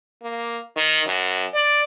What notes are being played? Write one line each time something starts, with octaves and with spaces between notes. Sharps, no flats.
A#3
D#3
F#2
D5